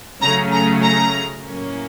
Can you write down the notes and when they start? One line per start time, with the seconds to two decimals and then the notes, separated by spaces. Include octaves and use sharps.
0.21 C#3 F#3 A3 C#4 A#5
0.52 A#5
0.83 A#5
1.45 A2 F#3 A#3 C#4